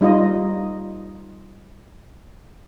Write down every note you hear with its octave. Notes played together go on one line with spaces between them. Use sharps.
G3 D#4 F4 D#5